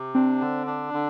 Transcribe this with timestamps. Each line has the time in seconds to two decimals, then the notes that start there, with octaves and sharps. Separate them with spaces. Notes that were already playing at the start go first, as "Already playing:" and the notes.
Already playing: C3
0.15 C4 D4
0.41 D3
0.67 D4
0.94 D3